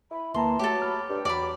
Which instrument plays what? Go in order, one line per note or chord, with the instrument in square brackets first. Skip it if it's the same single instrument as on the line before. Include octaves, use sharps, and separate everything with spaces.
[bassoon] E4 [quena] B5
[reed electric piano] D2 A#3 A#5 [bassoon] E3 [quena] A5 [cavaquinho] C6
[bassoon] F#3 [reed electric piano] A3 [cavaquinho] G4 A4
[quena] B5 [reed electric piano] F6
[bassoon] G2 [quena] G5
[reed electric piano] E2 D6 [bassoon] F#3 [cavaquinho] D5 B5